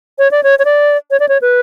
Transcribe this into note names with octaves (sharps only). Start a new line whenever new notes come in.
C#5
D5
C#5
C#5
D5
C#5
D5
C#5
B4